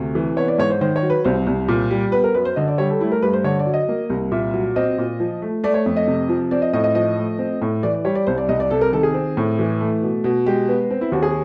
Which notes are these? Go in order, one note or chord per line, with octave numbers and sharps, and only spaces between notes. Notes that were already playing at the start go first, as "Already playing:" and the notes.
Already playing: D2 C3
E3
B3 C#5
D5
G#2 C#5
C5
D#3 C5
C#5
F#3
B4
C2 C5
C2
A#2
G3
B3 B4
A#4
F#2 B4
C5
D3 D#5
D5
G3 C#5
A4
A3 E4
A#4
G2 B4
C5
D3 C#5
D5
F#3
D#5
A#3
C2
A#2 E5
F#3
C4 D#5
A#2
F3
A3
A3 D5
C#5
F2
D#5
C3
F3
C4 D5
D#5
A2 D#5
D#5
F3 D#5
A3
C4
A2
E3 D5
D5
G3 C#5
D5
C2 C5
D5
C2 D#5
D5
C3 A4
A#4
D#3 A4
G#4
C4
A2
E3
A3
B2
B2
G#3 G4
B3
C4
E4
D#2 F#4
G#4